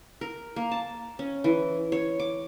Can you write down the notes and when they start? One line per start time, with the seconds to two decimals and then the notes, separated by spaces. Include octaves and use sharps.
0.21 A#4
0.56 A#3
0.71 A5
1.19 C#4
1.44 E3
1.92 C#5
2.20 D6